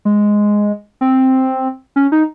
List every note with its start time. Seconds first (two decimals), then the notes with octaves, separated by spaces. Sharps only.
0.05 G#3
1.01 C4
1.96 C#4
2.12 D#4